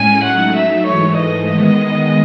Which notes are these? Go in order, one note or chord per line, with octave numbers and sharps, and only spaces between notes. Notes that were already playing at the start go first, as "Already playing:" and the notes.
Already playing: A2 G#3 C#4 G#4 G#5
F#3 A3 D#4 F#5
E5
G#2 E3 A3 C#5
D#5
D#3 G#3 B3